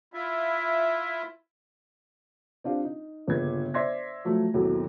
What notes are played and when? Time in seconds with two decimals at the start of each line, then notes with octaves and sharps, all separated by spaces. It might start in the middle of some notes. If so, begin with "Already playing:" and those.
0.14 E4 F4 E5
2.64 C4 D4 F4 G4
2.84 D#4
3.28 G1 A#2 C#3 B4 G#6
3.74 C5 D5 E5 C6 G#6 A#6
4.25 F3 F#3 A3
4.54 G#1 D#2 B2 F#3 E4 A4